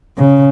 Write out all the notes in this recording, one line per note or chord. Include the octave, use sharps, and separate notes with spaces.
C#3